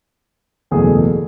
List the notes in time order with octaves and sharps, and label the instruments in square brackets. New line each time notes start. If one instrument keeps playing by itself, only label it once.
[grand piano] F#1 E2 B2 A3 G#4